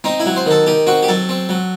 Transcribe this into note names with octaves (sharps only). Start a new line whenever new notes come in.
C4 D#4
E4
F#3
C5
D#3 A4
D#3 G4
C4 F#4
G4
F#3 A4
C4
F#3